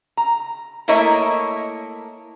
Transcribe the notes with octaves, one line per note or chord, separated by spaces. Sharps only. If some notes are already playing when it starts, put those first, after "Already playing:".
A#5
A3 A#3 E4 A#4 C#5 D#5